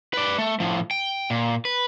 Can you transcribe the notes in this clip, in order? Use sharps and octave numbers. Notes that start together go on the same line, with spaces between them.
B4 D5
A3
A2 F3
G5
A#2
B4